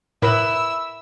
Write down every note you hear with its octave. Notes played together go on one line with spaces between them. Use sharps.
A2 E4 A#4 B4 B5 E6